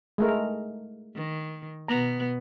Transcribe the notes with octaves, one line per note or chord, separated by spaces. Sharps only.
G#3 A3 A#4
D#3
B2 B3 A#5